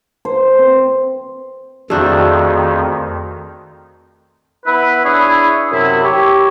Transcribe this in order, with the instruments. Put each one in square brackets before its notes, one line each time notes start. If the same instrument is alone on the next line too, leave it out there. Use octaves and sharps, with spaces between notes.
[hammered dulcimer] C5
C4
[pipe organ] F2 D#3 [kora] A3 D4 [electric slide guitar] F#4 G#4
[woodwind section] B3 E4 B4
D4 E4 G#4 C#5
F#2 C3 E4
G4 C#5